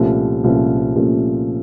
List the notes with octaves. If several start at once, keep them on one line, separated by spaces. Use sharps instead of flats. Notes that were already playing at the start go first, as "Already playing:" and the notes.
Already playing: C2 A#2 F3 A3 C#4
C2 A#2 F3 A3 C#4
C2 A#2 F3 A3 C#4